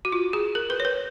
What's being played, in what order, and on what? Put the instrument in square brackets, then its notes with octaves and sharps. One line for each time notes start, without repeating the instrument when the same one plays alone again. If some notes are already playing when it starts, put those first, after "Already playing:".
[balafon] F#4
F4
G#4
A#4
B4
C#5
B4